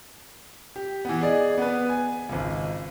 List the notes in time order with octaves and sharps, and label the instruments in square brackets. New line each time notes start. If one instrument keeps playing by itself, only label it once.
[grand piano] G4
E3 B3
G#4 D5 D#5
B3 B4
G#5
G#1 C#2